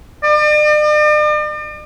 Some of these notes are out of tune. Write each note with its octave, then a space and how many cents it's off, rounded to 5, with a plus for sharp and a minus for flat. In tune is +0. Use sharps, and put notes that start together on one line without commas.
D5 +45